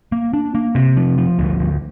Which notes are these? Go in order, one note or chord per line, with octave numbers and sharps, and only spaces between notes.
A#3
D4
A#3
C3
F3
F3
D2
D2